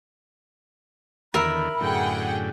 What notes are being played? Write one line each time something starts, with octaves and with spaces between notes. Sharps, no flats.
E2 D3 D#3 A#4 E5 B5
F#2 A2 D3 G#4 F#5 G5